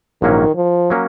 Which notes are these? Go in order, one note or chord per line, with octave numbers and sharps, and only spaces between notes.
A#1 G#2 D#3 F#3 A#3 C#4
F3
F#3 A#3 C#4